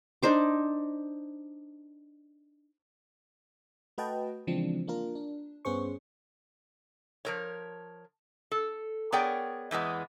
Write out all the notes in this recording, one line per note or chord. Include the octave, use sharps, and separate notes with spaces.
D4 D#4 C5 D6
A3 F#4 B4 D#5 G5 A5
C#3 E3 F3 G#3 C4 D4
A#3 D4 F4 A#4
D4
G2 B3 C#4 G#4 C5 C#6
F3 A#4 C#5
A4
B3 G#4 A#4 C#5 D5 G5
E2 E3 G#3 B3